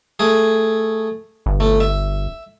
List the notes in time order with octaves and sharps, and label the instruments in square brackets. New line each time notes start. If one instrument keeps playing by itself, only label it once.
[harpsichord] A3 G#4
[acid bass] G1
[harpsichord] A3
E5